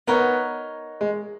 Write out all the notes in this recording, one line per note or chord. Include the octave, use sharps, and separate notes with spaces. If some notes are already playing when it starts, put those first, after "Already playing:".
B3 D#4 A#4 C#5 F#5
G#3